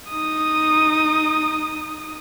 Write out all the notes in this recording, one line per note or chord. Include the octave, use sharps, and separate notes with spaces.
D#4 D#6